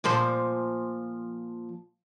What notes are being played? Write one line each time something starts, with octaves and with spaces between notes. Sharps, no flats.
A#2 F3 C5